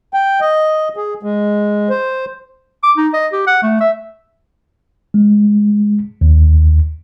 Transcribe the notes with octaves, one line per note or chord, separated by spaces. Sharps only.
G5
D#5
G#4
G#3
C5
D6
D#4
D#5
G4
F#5
A3
E5
G#3
D#2